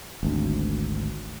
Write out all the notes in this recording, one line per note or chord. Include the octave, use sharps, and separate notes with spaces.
G#1 D2